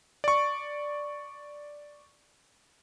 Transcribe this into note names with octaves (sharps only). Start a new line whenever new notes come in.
D5 C#6